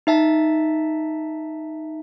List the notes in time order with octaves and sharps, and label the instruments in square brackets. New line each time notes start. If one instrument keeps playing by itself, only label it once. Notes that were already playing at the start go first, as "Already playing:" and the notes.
[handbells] D#4 E5 A5